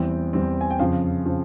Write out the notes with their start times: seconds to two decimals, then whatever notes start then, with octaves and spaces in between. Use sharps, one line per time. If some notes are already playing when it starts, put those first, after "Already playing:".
Already playing: E2 E3 G3 C4 G5
0.33 E2 E3 G3 C4
0.61 G#5
0.70 G5
0.79 F2 C#3 F3 F5
1.26 C#3 F3